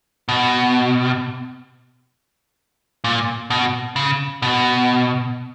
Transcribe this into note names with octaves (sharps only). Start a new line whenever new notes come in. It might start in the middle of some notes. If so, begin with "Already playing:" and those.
B2
A#2
B2
C#3
B2